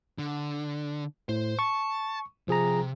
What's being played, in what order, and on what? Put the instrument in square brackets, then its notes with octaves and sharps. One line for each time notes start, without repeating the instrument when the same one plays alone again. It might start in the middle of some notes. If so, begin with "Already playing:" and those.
[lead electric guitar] D3
[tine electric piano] A2 [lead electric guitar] C5
[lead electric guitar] A5 [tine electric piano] C#6
[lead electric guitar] C3 [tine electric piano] F3 G#4 A#5